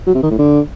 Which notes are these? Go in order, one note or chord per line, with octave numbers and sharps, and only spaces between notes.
F#3
C3
D#3
A2
D3